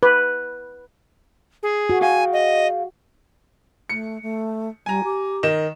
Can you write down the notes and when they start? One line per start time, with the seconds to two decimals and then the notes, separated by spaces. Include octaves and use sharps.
0.03 B4
1.63 G#4
1.90 F#4
2.01 G#4 F5 G5 G#5
2.33 D#5
3.89 A3 C#7
4.22 A3
4.86 G3 G#5 A#5
5.04 G4
5.43 D#3 D#5 E7